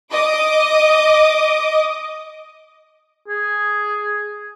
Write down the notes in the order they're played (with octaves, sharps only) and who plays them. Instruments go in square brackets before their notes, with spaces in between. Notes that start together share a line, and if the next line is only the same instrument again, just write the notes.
[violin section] D#5 D6 D#6
[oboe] G#4